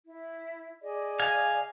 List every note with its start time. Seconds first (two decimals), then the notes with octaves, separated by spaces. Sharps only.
0.04 E4
0.82 G#4 D5 D#5
1.19 F5 G#5